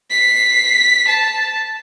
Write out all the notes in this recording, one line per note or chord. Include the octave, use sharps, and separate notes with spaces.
B6 C7
A5